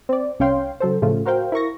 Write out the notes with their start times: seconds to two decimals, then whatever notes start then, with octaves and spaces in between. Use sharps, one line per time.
0.09 C4 D5
0.40 C2 C#4 C#5 F5 G5 C6
0.80 C#3 F#3 A4 C5
1.02 A2 C#3 F3 A3 F4
1.26 F#4 A#4 C5 F5 G5
1.52 E4 A#4 C#6 A#6